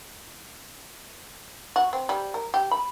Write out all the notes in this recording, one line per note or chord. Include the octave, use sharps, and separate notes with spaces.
F#4
C4
G3
A#4
G4
B5